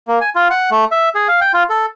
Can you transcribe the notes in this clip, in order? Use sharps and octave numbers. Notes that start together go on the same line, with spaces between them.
A#3
G#5
F4
F#5
A3
E5
G#4
F5
G5
F4
A4